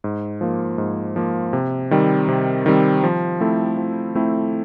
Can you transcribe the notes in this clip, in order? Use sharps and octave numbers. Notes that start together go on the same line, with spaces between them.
G#2
F3 A#3
G#2
F3 A#3
C3
D#3 G3 C4
C3
D#3 G3 C4
F3
A3 C4 E4 A4
F3
A3 C4 E4 A4